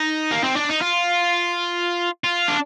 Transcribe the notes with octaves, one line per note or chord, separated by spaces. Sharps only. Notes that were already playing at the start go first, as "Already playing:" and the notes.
Already playing: D#4
A#3
C4
D4
D#4
F4
F4
D4